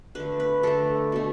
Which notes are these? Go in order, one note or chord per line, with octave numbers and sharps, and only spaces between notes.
D3 A3 B4
B4
D3 A3 A4
B2 A3